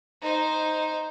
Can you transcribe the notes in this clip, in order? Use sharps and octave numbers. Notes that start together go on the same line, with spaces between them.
D#4 C5